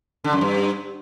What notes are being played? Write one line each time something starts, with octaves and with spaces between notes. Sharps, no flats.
D3
F#2
G2